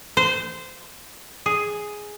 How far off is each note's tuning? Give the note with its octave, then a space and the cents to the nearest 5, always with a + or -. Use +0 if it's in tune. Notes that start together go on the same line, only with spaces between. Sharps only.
C5 -20
G#4 +5